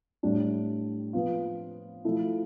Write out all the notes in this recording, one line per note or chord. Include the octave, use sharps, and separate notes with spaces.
A2 G3 D4
F3 B3 F4
F3 A3 E4